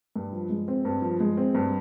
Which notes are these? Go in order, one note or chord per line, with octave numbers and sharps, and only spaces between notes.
G2
F3
G#3
C4
G2
F3
G#3
C4
G2